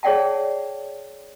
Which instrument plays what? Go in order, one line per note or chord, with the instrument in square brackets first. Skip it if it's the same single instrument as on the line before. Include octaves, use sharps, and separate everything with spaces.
[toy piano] G#4 C#5 D5 F#5 G5 A5